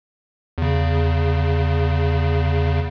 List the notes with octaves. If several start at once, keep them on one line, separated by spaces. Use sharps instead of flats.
E2 C#3